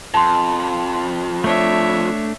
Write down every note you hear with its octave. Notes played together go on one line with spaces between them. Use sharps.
F2 A5 C6
A3 D4 C#5 E5